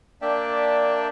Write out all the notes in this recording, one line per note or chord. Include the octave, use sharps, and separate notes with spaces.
A#3 D4 D5 E5 G5 A5